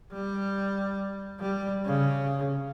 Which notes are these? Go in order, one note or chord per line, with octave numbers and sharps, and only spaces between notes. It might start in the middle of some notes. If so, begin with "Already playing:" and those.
G3
G3
C#3